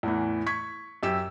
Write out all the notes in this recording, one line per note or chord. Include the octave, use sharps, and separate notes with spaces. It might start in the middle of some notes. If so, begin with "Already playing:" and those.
E2 A2 E3
C#6 G#6 B6
F#2 G4 E6 E7